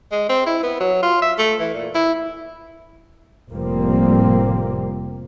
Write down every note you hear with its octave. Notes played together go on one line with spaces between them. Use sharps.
G#3
C4
E4
B3
F#3
F4
E5
A3
E3
A#2
E4
F1 A2 F3 G3 A#3 C4